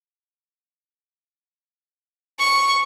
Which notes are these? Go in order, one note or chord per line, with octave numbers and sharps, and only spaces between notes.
C#6